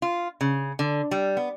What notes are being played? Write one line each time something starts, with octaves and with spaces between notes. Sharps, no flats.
F4
C#3
D3
G3
B3